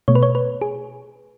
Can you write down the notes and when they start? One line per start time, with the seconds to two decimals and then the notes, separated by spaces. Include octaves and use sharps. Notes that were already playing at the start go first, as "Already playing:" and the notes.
0.08 B2 A3 C#5
0.15 B4
0.23 C#5
0.35 B4
0.61 G#4